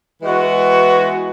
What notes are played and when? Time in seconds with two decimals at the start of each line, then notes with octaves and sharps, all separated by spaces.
0.22 E3 G#3 B3 F#4